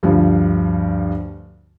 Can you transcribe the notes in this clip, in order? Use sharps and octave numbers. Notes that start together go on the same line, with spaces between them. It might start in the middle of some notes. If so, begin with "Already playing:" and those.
D2 G2 F3